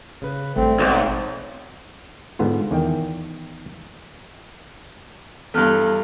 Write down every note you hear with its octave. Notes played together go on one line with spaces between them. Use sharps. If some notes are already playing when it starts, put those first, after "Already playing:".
C#3 B4
A1 G2 A3 C4
B1 G#3 C4 D#4 D5 D#5
G#2 D3 B3 F4
E2 D#3 G5
E2 G2 A4 F6 F#6